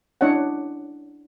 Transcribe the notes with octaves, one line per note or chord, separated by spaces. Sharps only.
C#4 D4 E4 C#5 D#5 F#5